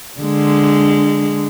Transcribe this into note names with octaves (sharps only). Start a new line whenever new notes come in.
D3 G#3